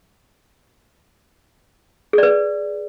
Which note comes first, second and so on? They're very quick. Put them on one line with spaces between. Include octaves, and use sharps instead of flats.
G#4 D5 B4